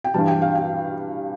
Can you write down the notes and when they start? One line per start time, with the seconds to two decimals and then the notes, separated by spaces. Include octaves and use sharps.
0.04 G5
0.14 G2 E3 G3 A5
0.28 G5
0.42 F5
0.55 G5